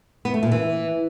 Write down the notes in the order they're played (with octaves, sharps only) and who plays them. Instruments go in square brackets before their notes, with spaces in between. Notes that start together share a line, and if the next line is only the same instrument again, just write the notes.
[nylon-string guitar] B3
A3
A#2
E3